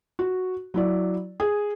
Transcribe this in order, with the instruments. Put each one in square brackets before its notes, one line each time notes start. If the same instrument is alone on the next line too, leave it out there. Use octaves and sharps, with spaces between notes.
[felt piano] F#4
F#3 E4 D5
G#4